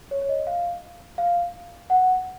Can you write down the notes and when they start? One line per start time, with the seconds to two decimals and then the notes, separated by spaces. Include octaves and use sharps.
0.11 C#5
0.22 C#5
0.29 D#5
0.47 F5
1.18 F5
1.90 F#5